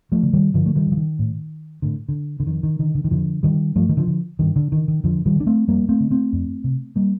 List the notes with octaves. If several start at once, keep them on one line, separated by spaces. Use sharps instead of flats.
F3 A3
D3
D#3 G3
G2 D3 F3
A3
D#3 G3
D3
F3
D#3
A2
A2 D3
D3
D3
F2 D#3
D#3
D3 D#3
D3
D#3
F2 D3 F3
D3 D#3 G3
G2 F3 A3
D#3
D3 F3
D3
G2 D#3
D3
D3 D#3
D#3
F2 D3 F3
D#3 G3
D3 D4
A3 C4
F2 G3 A#3
A3 C4
D3
A3 C4
F2
C3
G3 A#3